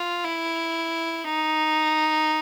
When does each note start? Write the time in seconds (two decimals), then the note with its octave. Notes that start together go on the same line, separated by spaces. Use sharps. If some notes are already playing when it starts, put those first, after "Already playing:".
Already playing: F4
0.24 E4
1.24 D#4